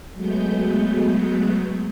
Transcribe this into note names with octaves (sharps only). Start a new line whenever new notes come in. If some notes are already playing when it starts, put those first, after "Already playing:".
F#3 G#3 A3 B3 G6